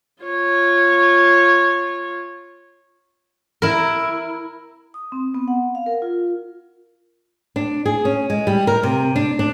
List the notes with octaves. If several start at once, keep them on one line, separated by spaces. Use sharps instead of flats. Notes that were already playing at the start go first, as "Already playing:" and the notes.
F4 C#5
E4 A#4
D#6
C4
B3
F#5
F5
A#4
F4
D4
G#4
C#4
G#3
G3
A#4
C3
D4
D4